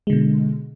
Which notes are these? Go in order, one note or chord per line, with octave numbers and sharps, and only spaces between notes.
B2 D3 G#3